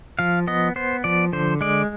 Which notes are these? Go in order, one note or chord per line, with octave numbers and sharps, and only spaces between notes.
F3 F5
B3 D#5
B3 C5
F3 D5
D3 C5
G#3 D5